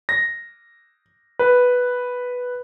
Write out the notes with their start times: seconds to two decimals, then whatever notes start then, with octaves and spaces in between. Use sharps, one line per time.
0.09 A#6
1.39 B4